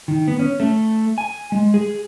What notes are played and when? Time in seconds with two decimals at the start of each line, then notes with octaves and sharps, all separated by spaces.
0.08 D#3
0.28 B3
0.39 C#4
0.60 A3
1.18 G#5
1.52 G#3
1.74 G#4